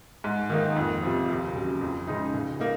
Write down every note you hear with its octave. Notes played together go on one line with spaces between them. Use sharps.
G#2
D#3 A#3 D#4
F2
C3 F3
D#2
C#3 F#3
F2
C#3 G#3 D#4
C#2
A#3 D#4